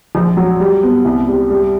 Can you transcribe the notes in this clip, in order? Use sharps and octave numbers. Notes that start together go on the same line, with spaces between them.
A#1
F#3
G3
B3
C2
G3
G3